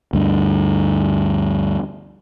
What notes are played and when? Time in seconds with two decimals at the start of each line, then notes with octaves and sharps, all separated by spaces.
0.13 D2 G2